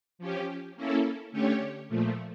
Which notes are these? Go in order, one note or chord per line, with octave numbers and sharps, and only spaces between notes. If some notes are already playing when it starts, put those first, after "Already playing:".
F3 C#4 G4
A#3 C#4 E4 A4
D3 A3 C#4 G4 C#5
A#2 F3 A3